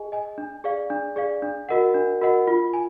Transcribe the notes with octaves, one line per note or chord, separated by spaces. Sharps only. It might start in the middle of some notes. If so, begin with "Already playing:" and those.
Already playing: G#4 D#5 G#5
D#5 G#5
D4
G#4 D5 F5
D4
G#4 D5 F5
D4
F#4 A#4 D#5 F#5
D4
F#4 A#4 D#5 F#5
F4
G#5